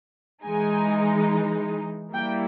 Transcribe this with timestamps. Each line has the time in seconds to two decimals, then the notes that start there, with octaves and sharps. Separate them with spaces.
0.44 E3 G#3 D#4 G#5
2.13 G3 A#3 E4 G5